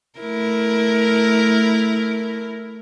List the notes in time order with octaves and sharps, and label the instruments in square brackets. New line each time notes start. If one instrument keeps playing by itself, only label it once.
[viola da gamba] A3 E4 A#4